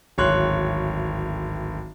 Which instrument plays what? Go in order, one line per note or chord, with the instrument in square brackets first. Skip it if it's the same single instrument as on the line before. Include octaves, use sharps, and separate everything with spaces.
[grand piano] D1 G#1 C#5 C6 F#6